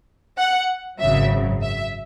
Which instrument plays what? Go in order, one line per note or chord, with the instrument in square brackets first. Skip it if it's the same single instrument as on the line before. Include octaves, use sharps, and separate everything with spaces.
[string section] F#5
G#1 F#2 C#3 F#3 E5
E5